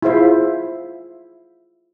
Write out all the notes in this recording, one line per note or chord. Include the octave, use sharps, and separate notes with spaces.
E4 F4 G#4 C5 E5 F5